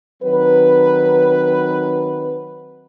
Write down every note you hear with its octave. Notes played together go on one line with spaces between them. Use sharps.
D#3 F#3 C4 B4